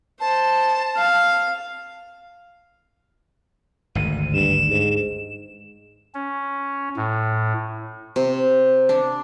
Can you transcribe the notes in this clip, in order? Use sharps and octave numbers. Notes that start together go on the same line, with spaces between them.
C5 A5
F5
G#1 D2 D#7
G2 E7
G#2
C#4
A2
C3
D4